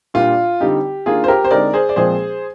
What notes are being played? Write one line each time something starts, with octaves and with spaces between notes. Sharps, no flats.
A#2 G3 D4 F4
D3 G3 C4 D#4 G4
D#3 A#3 D4 F4 G#4
C5
G4 A#4
C5
D3 G#3 C4 D#4 A#4 D5
G#4 C5
D5
A#2 F3 G#3 C4 G#4 C5